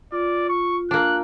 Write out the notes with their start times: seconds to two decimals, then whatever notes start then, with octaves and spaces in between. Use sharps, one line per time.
0.12 F4 D5
0.49 C#6
0.91 A#3 D4 F#6